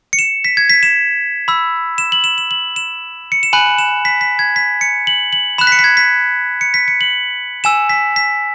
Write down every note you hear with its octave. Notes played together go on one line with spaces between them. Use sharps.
C#7
E7
B6
G#6
B6
E7
B5 E6
E7
F#7
E7
E7
F#7
E7
C#7
E7
G#5 B5 F#6 F#7
E7
B6
B6
G#6
B6
C#7
F#7
F#7
B5 F#6 E7
B6
C#7
B6
G#6
B6
C#7
B6
C#7
F#7
G#5 E6 E7
B6
B6